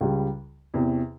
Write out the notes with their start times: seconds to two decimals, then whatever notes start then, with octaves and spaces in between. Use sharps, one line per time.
0.01 C#2 C#3 G3
0.74 E2 C3 E3